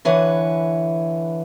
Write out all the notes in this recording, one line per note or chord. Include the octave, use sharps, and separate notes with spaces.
D3 E3 B4 C#5